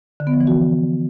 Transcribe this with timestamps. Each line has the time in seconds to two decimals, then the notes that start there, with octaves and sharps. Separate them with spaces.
0.20 D3
0.27 B3
0.34 F3
0.40 E3
0.47 F#4